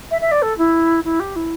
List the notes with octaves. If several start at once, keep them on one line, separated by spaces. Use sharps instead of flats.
E5
E5
D5
A4
E4
E4
G4
E4